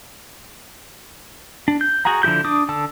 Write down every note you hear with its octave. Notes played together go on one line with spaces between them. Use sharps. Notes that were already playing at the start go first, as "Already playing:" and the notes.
D4
G6
F#4 G#4 F#5 A#5
D3 F3 E4 G4 G6
D4 D6 D#6
D3 A5 E6